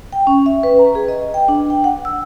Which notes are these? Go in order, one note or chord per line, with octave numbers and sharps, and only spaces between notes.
G5
C#4
E5
B4
A#5
G#4
D#5
G5
D4
G5
F#5
E6